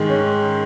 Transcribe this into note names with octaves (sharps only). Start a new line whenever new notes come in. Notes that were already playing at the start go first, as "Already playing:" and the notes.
Already playing: G#2 D#3 G#3
C#4